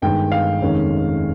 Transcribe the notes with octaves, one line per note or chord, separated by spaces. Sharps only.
G1 G2 D#3 G#3 G5
F5
F1 D#2 D#3 G#3 C#4